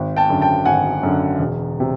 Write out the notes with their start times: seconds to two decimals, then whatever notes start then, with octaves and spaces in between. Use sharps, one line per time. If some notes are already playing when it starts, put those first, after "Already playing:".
Already playing: G#1
0.17 G5 A5
0.30 F#2 D3
0.41 G5 A5
0.65 G#1 F#5 G#5
1.03 F#2 D3
1.39 E1
1.80 C3